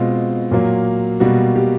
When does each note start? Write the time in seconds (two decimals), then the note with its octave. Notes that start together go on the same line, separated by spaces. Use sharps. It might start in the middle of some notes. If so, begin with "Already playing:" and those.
Already playing: B2 G#3 C4 F4
0.51 A#2 F#3 A#3
1.20 B2 G3 A#3 F#4
1.56 G4